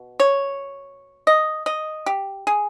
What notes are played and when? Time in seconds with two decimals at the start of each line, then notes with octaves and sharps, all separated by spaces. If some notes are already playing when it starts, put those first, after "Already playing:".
Already playing: B2
0.20 C#5
1.27 D#5
1.66 D#5
2.06 G4
2.47 G#4